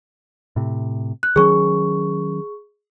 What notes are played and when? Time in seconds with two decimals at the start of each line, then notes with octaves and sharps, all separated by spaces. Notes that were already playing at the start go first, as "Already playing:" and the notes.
0.56 A2 C3
1.23 F#6
1.36 D#3 F#3 C#4 G#4 C#6